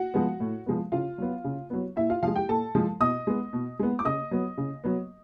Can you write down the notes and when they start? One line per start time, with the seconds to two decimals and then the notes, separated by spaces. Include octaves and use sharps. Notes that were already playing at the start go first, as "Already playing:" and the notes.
Already playing: F#4 F#5
0.14 F3 G#3 B3
0.40 A2
0.66 F3 G#3 B3
0.92 C#3 F4 F5
1.18 F#3 B3
1.44 C#3
1.70 F#3 B3
1.96 A#2 E4 E5
2.10 F4 F5
2.22 F3 F4 F5
2.27 G#3
2.36 G4 G5
2.48 A#2 A4 A5
2.75 F3 G#3
3.00 B2 D#5 D#6
3.27 G#3 B3
3.53 B2
3.79 G#3 B3
3.99 D6
4.05 C#3 D#5 D#6
4.31 F#3 B3
4.58 C#3
4.84 F#3 B3